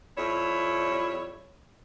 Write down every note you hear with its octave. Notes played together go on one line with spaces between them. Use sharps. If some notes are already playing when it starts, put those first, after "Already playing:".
F2 G3 E4 C#5